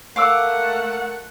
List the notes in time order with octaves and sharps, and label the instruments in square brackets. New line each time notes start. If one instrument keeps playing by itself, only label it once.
[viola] A3 F#5 [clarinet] A#4 [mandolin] F5 D6 E6